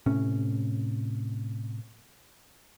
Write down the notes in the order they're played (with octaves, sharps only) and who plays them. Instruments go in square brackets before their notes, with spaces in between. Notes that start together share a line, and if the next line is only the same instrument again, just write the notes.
[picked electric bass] A2 C3 C#4